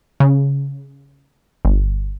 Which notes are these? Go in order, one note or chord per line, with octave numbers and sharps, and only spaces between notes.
C#3
G1